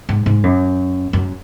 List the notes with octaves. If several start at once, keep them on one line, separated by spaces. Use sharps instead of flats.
G#2
G#2
F#2
F#2